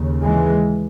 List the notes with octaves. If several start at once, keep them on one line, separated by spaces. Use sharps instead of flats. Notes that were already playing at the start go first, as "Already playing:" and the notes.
Already playing: D#2 C#3
E3 G#3